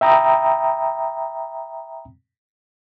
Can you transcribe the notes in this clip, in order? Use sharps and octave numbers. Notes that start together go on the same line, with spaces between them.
E5 G5 A#5 B5 D#6